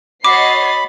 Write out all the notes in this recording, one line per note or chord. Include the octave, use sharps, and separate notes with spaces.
F#4 C#5 D#5 B5 D6 A6 C7